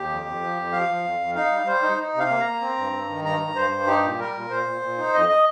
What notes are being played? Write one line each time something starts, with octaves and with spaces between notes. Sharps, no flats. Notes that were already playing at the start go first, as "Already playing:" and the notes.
Already playing: D#2 G4
F2
F2
F3
F2
F3 F5
F3
F2
F2
D#4 F5
G3
G3 C5
D#4
D#4
C3 F5
A#3
A#5
A#3
C4
G2
G2
D#3
G2 A#5
G2
G2 C5
G2
D#4 G4
A#2
G3 A#4
A#2
A#2 C5
A#2
A#2
D#4
F2 D#5
D#5